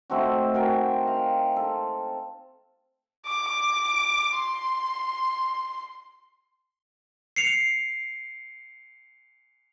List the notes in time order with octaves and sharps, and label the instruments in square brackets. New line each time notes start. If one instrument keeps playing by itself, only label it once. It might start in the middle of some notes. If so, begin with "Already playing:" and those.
[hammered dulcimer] A3 C4 D#4 F#4
F#4 A#4 G5 G#5
F5
A4
[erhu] D6
C6
[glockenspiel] C7 C#7 F7